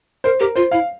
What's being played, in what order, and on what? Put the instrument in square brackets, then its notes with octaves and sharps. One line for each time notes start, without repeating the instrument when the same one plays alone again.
[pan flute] A#4 [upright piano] C5
[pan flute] G4 [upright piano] A#4
[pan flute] F4 [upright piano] C5
[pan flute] E4 [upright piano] F5